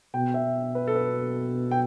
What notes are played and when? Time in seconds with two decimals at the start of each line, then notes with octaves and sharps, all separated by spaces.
0.14 B2 G5
0.34 E5
0.75 B4
0.88 A4
0.96 B4
1.71 G5